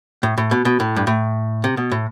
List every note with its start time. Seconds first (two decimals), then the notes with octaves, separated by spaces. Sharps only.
0.23 A2
0.38 A2
0.51 B2
0.65 B2
0.80 A2
0.96 G2
1.07 A2
1.64 C3
1.77 B2
1.91 A2